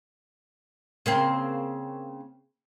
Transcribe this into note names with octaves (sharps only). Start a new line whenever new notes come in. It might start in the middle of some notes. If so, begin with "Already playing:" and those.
C#3 A#3 C4